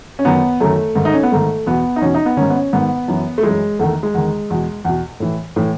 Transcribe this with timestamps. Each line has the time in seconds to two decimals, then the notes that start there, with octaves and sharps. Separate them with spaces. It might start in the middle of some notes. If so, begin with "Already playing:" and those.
0.19 C#4
0.25 F#2 D#3 B3
0.61 F#2 D#3 A3
0.96 G#2 D#3
1.05 D#4
1.14 C#4
1.23 B3
1.32 G#2 D#3 A3
1.66 E2 B2 B3
1.96 D#4
2.02 E2 B2 C#4
2.14 D#4
2.26 B3
2.37 G#2 D#3 C#4
2.50 B3
2.55 C#4
2.73 G#2 D#3 B3
3.08 F#2 E3
3.38 A3
3.43 F#2 E3 G#3
3.79 E2 D#3 A3
4.03 G#3
4.14 E2 D#3
4.50 E2 B2
4.85 E2 B2
5.20 A2 E3
5.56 A2 E3